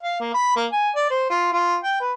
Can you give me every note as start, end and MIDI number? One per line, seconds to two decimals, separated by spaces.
0.03 0.17 77
0.20 0.34 58
0.34 0.55 83
0.56 0.66 58
0.72 0.90 80
0.95 1.09 74
1.10 1.25 72
1.30 1.50 65
1.52 1.77 65
1.83 1.98 79
2.01 2.13 71